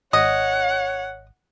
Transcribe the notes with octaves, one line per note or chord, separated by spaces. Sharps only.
G#1 C#5 D#5 F#5